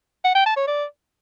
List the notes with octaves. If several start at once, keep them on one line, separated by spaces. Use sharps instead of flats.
F#5
G5
A5
C#5
D5